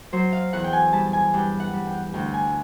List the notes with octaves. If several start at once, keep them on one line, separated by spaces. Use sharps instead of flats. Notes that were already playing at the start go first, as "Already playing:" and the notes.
F#3 C5
F5
E2 F#5
G5
G#5
G3 A5
G#5
G2 G5
F#5
G3
G5
D2 G5
G#5